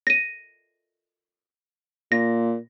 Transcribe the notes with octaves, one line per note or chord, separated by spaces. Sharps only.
A#6 D#7
A#2 A#6